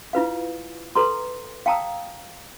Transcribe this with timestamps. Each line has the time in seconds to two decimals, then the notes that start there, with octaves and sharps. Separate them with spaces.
0.13 E4 F4 B4 F5
0.96 A4 B4 A#5 C6
1.66 F5 G5 A5 A#5 D#6 E6